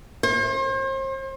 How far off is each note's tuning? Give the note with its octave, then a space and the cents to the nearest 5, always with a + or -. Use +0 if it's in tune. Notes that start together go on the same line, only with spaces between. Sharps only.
C5 +40